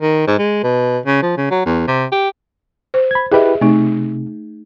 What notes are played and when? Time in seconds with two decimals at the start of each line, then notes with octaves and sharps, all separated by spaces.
0.02 D#3
0.27 G#2
0.39 G#3
0.64 B2
1.06 C#3
1.22 F3
1.37 C#3
1.51 F#3
1.66 E2
1.88 C3
2.12 G4
2.94 C5
3.11 B5 G#6
3.32 E4 G4 G#4 B4 D#5 E5
3.61 C3 A3 D#4